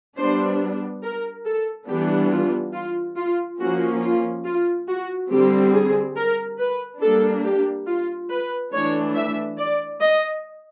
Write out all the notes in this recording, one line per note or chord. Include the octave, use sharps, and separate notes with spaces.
G3 B3 D4 C5
A#4
A4
E3 G3 B3 D4 G4
F4
F4
F4
F3 A#3 C#4 F#4
F4
F4
F#4
D3 G3 C4 G4
G#4
A#4
B4
G3 A#3 D4 A4
G4
F4
B4
E3 A3 D4 C#5
E5
D5
D#5